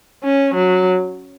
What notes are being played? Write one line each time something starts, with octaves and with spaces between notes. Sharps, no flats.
C#4
F#3